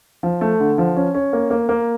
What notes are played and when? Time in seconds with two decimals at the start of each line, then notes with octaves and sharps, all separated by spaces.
0.23 F3
0.41 A3
0.60 D3
0.78 F3
0.96 C#4
1.14 C#4
1.33 A#3
1.50 A#3
1.69 A#3